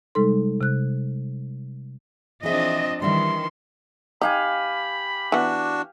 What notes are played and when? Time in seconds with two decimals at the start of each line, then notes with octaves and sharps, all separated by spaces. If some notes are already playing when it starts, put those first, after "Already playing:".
0.15 C3 G3 G#3 D#4 A4 C6
0.61 C3 F#6
2.43 E3 F3 C4 D4 G#4 D#5 E5
3.02 D#3 E3 G3 E5 C6
4.21 D#4 G4 F5 G#5 B5
5.32 E3 B3 D4 F#4